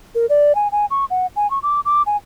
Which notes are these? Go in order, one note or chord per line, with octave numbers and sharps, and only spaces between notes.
A#4
D5
G#5
G#5
C#6
F#5
G#5
C#6
D6
D6
G#5